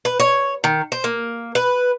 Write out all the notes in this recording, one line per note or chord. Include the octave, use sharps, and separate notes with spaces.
B4
C#5
D#3
C5
A#3
B4